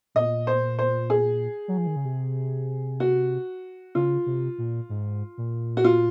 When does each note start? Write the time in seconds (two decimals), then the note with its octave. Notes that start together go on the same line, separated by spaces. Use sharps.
0.15 A#2 D#5
0.47 C5
0.79 C5
1.10 G#4
1.68 F#3
1.77 F3
1.87 D#3
1.96 C#3
2.05 C3
3.00 F#4
3.95 C#3 F4
4.26 C3
4.58 A#2
4.89 G#2
5.38 A#2
5.77 F#4
5.84 F4